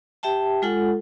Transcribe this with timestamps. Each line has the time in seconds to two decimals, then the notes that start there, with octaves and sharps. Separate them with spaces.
0.23 G4 E5 G5 A5
0.62 G#3 F4 A4 F#5